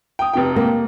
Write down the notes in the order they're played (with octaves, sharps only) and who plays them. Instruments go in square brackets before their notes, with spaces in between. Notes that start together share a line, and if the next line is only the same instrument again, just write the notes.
[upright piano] G5 D#6
F1 C3 G5
[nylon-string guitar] A#3